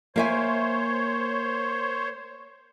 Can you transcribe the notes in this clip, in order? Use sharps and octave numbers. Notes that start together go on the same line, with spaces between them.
A#3 C5 C#5 E5 G#5